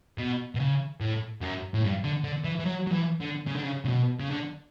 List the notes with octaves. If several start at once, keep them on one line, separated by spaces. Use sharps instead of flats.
B2
B2
C#3
A2
F#2
A2
G2
D3
D3
E3
E3
F#3
F#3
E3
D3
C#3
D3
C#3
C#3
B2
C#3
D3